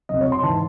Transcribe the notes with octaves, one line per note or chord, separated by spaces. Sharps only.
C2 C3 F#3 D#5
C#5
C6
G#2 E3 A5